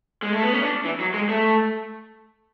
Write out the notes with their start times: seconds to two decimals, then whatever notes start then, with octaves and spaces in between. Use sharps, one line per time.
0.22 G#3
0.32 A3
0.43 B3
0.53 C#4
0.62 D4
0.85 E3
1.00 F#3
1.14 G#3
1.29 A3